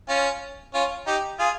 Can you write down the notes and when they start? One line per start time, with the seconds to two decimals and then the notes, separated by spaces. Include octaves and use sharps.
0.08 C#4 F4
0.74 C#4 F4
1.07 D#4 G4
1.39 F4 G#4